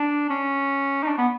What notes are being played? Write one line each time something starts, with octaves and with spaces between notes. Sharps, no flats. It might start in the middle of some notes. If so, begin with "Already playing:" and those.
Already playing: D4
C#4
D#4
D4
B3